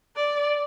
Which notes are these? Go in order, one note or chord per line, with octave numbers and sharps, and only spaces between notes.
D5